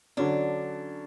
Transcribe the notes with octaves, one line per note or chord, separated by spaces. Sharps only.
D3 F#3 C#4 D4